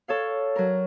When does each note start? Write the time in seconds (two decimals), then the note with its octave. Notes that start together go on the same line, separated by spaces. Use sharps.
0.08 A4 C#5 F5
0.56 F#3 A#4